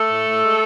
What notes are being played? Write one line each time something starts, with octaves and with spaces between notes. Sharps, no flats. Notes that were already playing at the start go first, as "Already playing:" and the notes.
Already playing: A3 A4
A2
A2
G#3